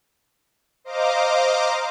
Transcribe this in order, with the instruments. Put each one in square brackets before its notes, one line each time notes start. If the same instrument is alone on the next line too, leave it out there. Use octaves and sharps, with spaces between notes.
[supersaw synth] C5 D#5 F5 A#5 D6